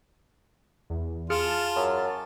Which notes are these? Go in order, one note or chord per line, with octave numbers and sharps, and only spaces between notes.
E2
F4 G#4 A5 F6 C#7
F#2